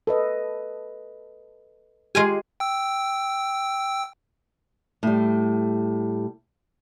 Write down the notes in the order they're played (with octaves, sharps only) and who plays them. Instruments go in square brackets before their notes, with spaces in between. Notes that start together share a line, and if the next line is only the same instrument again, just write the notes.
[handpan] A4 B4 D#5
[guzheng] G#3 F5 G#5 [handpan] F4 G4
[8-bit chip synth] G5 E6
[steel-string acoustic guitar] A2 G3